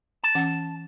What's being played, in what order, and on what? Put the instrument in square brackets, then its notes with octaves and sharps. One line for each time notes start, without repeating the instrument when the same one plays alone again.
[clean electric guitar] A5
[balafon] E3 C#4 F#5